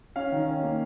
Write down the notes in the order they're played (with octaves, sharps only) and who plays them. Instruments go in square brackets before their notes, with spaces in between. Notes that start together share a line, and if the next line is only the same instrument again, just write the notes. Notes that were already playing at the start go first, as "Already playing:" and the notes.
[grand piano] C#4 F5
D#3
C#4
A#3